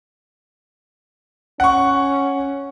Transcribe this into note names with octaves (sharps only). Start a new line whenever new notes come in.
C#4 F#5 C#6